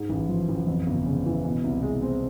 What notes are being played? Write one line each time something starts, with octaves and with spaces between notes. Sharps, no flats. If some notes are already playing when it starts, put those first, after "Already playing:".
Already playing: G#2
A1
F3
A1
F2
G1
C#3
E3
B2
C2
G#3
C4